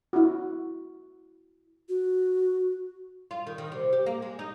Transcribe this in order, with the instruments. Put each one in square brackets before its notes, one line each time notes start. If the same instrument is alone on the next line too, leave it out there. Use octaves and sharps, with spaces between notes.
[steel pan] E4 F#4
[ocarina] F#4
[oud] F4
D#3
D#3
C3
G4
A#3
G#3
D#4